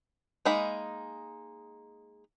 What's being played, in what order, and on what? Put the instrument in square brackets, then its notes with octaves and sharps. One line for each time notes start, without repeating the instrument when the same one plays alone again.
[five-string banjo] G#3 A#3 D#4 B5